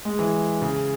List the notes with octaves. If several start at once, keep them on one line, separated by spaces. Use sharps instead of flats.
G#3
E3
C#3